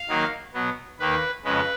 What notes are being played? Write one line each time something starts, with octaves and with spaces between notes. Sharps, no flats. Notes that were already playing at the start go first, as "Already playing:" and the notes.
Already playing: F5
D#3 F#3 A#3 D#4
B2 F#3 B3
D#2 D#3 A#3 B4
F2 C#3 G#3 B4